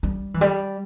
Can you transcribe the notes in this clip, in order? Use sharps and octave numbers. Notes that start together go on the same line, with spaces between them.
G3
E3
G3